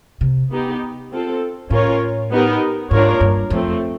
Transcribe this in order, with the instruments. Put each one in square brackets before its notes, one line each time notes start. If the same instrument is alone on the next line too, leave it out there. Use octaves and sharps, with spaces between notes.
[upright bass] C3
[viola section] B3 D#4 G4
C4 F4 A4
[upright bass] A2 [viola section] C#4 F4 A#4 C#5
[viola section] B3 D#4 G4 A#4
[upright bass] G#2 [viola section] A#3 D4 F4 A#4 C#5
[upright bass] G2
[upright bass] F2 [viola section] F3 A3 C4